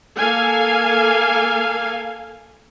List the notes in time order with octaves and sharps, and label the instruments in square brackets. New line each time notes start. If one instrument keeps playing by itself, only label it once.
[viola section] A#3 A4 F5 G#5